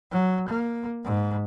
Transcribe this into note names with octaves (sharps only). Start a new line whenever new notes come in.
F#3
A#3
G#2